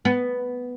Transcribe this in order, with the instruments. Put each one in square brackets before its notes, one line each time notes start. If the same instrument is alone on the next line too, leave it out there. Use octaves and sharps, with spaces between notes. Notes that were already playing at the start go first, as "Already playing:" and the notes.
[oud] B3